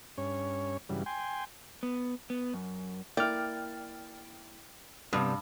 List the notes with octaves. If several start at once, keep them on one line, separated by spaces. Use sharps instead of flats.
G2 C#4 C#5
G2 C#3 E3 F#3 G3
G5 G#5 C6
B3
B3
F#2
A#3 E4 D5 G5 F6
G2 C3 G3 B3 D#6